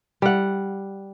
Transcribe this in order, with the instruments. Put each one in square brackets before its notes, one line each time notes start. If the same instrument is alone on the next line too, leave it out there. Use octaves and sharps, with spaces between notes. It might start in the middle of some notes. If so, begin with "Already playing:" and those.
[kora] G3 F#5